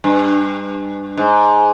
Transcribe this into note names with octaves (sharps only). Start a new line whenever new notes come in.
G2
G#2